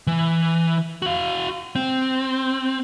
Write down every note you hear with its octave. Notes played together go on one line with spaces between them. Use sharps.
E3
F#4 F5
C4